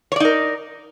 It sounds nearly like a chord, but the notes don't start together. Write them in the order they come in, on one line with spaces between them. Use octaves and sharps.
C#5 D5 D#4 A#4